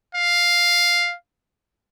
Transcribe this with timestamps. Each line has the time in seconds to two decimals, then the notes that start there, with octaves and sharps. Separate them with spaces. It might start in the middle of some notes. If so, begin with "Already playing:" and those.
0.15 F5